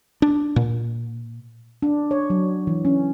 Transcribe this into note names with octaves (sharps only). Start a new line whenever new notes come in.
D4
A#2
D4
C#5
F#3
E3
C#4